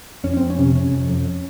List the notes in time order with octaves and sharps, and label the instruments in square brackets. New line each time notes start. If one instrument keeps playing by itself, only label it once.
[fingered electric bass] F2 C#4
F2 C4
C#4
C3
C3 C#4
F2
F2